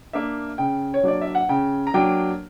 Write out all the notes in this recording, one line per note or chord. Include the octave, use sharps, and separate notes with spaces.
A#3 D4 E5
C#3 G5
C#5
F#3 A#3 D4 D5
E5
F#5
C#3 G5
A#5
F#3 A#3 D4 G5